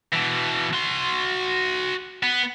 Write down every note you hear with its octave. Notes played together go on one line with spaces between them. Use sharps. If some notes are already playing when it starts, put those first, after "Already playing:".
B2 E3
F#4 C6
B3